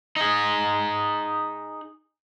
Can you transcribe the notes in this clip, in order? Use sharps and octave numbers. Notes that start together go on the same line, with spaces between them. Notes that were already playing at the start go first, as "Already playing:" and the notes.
D#4 G#4